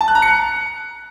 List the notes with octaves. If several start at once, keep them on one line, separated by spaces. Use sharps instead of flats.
A5
F#6
A#5
C#7